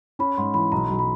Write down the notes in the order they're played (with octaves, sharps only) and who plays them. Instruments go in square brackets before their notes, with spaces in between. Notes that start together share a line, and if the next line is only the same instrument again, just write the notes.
[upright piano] C#4 [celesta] B5
[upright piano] G#2 [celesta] C6
[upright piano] E3 [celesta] B5
[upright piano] B1 [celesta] A#5
[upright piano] B1
[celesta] B5